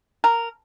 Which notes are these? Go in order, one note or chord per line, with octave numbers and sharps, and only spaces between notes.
A#4